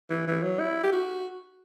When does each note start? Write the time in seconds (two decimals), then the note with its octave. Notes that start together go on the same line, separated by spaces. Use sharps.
0.10 E3
0.27 E3
0.43 F#3
0.59 E4
0.84 G4
0.92 F#4